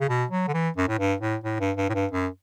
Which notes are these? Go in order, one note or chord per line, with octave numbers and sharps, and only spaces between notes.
C#3
B2
F#3
D3
E3
F#2
A2
G2
A2
A2
G2
G2
A2
G2
F#2